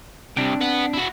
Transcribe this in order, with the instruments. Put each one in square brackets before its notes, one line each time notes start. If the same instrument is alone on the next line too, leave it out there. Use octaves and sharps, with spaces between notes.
[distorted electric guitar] C2 C3 [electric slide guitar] C4 D4 G5
[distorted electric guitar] B4 F#5
E4 F#4